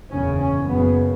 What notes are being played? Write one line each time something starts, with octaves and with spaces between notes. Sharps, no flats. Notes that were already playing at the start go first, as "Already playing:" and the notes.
F#1 E2 C#3 C#4
C#4
F#1 F#2 C#3 B3